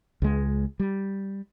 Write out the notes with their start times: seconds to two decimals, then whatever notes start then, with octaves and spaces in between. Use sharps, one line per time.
0.22 C#2 G#3
0.80 G3